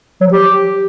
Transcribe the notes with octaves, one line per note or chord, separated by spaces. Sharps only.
F#3
F3
G4